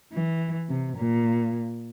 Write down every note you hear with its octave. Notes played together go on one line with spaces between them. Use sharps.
E3
C3
A#2